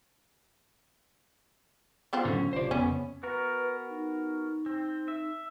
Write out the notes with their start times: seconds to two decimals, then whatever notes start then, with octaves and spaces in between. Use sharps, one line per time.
2.13 B3 C4 F4
2.25 A2 D3 F#3 C#4
2.53 G1 C3 F3 C5 D5
2.71 F2 C#3 B3 C#4
3.23 B3 F#4 A#4 B4
3.89 D#4
4.66 C4
5.08 E5